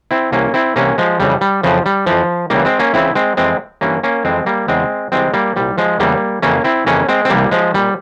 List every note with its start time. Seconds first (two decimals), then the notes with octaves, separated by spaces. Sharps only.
0.11 C4 E4
0.32 C2 C3 E3 A#3 C#4
0.54 C4 E4
0.76 C2 C3 E3 A#3 C#4
0.98 F3 G#3
1.20 F2 C#3 E3 G3
1.41 G3
1.63 F2 C#3 E3 F3
1.86 G3
2.06 F2 E3 F3
2.50 C#2 C#3 E3 G3 A#3
2.65 G#3 C4
2.79 A#3 C#4
2.94 C#2 C#3 E3 C4 E4
3.15 G#3 C4
3.37 F2 E3 G#3 C4
3.81 G2 E3 A#3 C#4
4.03 A#3 C#4
4.25 F2 E3 G#3 C4
4.46 G3 A#3
4.68 E2 C#3 E3 G#3 C4
5.12 C2 C3 E3 G#3 C4
5.34 G3 A#3
5.56 C2 A#2 G3
5.78 F3 G#3
5.99 E2 C#3 E3 G3 A#3
6.42 F2 C#3 E3 A#3 C#4
6.64 C4 E4
6.86 F2 C#3 E3 A#3 C#4
7.09 G#3 C4
7.25 C4
7.30 C2 C3 E3 G3 A#3
7.51 F3 G#3
7.74 A#2 G3